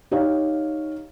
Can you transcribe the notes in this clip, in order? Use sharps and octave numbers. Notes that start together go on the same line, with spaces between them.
D#4 G4 C#5 F5